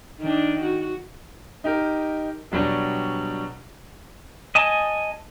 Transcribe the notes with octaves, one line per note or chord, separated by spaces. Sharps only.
D#3 D4
F#4
D#4 G4 A#4
B2 F#3 G3 D4
D#5 G#5 A5